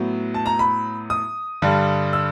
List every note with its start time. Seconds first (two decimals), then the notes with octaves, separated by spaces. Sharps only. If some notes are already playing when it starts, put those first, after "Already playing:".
Already playing: A2 F#3 B3
0.34 A5
0.46 A#5
0.59 B5
1.10 D#6
1.62 G2 D3 G3
2.13 E6